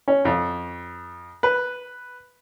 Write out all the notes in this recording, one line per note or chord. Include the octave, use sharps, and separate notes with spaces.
C#4
F2
B4